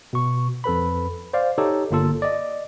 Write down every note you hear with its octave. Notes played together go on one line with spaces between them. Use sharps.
B2 C#6
F2 A4 B4 B5
C5 D5 F5
D#4 G4 A4 C#5
G1 A#3 F4 A4
D5 D#5